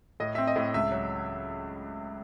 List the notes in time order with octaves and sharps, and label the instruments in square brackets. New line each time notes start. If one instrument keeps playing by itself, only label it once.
[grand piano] A2 D#5
C4 E5
D#5
A2
C#2 E5
F#3